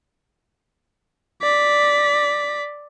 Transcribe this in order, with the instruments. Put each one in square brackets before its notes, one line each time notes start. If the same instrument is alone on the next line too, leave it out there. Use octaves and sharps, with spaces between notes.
[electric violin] D5 B6